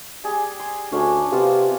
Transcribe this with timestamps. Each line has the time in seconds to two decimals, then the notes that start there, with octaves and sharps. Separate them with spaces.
0.24 G3 G#4 G5
0.59 C6
0.92 D2 C#4 D4
1.32 C3 B3 F4 F5